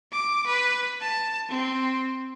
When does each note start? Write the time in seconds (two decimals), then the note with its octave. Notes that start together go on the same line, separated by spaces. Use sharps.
0.12 D6
0.46 B4
1.00 A5
1.50 C4